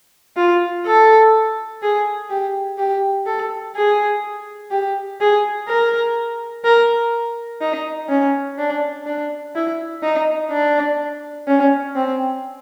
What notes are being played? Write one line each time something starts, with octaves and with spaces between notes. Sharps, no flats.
F4
A4
G#4
G4
G4
A4
G#4
G4
G#4
A#4
A#4
D#4
C#4
D4
D4
E4
D#4
D4
C#4
C4